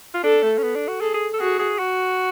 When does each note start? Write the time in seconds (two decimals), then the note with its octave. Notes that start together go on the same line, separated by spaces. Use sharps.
0.14 F4
0.24 D4 A4
0.43 A3
0.58 C#4
0.63 B3
0.75 D4
0.88 F#4
1.01 G#4 A4
1.14 G#4
1.34 A4
1.40 F#4 G#4
1.59 G#4
1.79 F#4